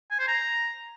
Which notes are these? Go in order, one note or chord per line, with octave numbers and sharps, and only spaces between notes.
G#5
C5
A#5